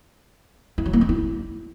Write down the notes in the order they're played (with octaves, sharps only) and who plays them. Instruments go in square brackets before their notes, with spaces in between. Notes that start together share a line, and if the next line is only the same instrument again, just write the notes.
[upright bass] E4
F#3
A#3
C4
E4